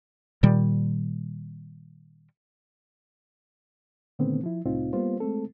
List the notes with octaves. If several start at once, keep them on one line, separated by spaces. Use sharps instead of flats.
A#2 D#3 G3
A#2 D3 D#3 A3 B3 C4
F3 E4
C2 A2 C4 D#4 F4
G3 A#3 B3 F4 C5
G#3 A3 C4 A4